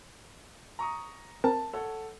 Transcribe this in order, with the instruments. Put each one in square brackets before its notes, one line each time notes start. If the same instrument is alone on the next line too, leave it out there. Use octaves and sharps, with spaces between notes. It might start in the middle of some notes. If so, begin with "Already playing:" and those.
[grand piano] A#5 C#6 D#6
[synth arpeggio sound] C4 A#4 [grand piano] A5
[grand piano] A4 C#5 F#5